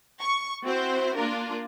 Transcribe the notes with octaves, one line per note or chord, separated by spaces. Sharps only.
C#6
C4 E4 F#4 C5
A#3 D4 F4 A#4